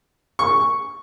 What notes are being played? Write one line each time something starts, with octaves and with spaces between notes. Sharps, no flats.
C#6